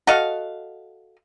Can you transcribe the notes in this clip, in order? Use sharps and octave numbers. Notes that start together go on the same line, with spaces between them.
F#4 A4 D#5 F5